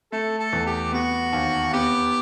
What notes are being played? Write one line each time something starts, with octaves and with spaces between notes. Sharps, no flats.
A3 A4
A4
E2
G4
B3 F#4
D#2
B3 G4